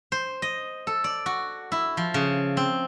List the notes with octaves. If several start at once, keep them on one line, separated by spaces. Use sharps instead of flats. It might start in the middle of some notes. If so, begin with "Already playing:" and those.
C5
D#5
A4
D5
F#4
E4
F3
C#3
C4